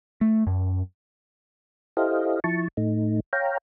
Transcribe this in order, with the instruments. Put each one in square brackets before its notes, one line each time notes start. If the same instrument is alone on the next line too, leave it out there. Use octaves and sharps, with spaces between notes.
[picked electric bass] A3
F#2
[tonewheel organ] E4 G4 A4 C5 D#5 F5
F3 E4 A5 C#6
A2 A3 D#4
C#5 F5 G5 A#5